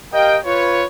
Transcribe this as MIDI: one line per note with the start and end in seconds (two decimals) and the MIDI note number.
0.12 0.37 67
0.12 0.37 70
0.12 0.37 75
0.12 0.37 77
0.12 0.37 79
0.44 0.84 65
0.44 0.84 71
0.44 0.84 73